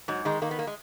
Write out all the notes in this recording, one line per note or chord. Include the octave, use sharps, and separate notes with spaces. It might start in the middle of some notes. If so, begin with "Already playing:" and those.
G#2 F#3
D#3 G#3
D#3 A#3
B3
A#3
G#3